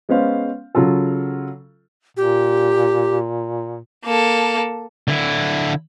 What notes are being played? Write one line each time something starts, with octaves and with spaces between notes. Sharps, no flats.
G#3 B3 C#4 C5 F5
C#3 F#3 F4 A4
A#2 G4
A#3 A4
D3 E4